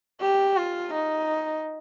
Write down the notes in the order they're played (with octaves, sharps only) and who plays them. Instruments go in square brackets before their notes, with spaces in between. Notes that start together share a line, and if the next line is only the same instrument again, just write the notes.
[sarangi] G4
F4
D#4